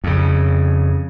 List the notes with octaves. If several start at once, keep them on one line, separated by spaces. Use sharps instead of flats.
F2 C#3